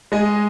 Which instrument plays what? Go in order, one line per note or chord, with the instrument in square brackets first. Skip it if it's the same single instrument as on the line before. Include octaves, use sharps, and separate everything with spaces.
[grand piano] G#3 D#5 G#5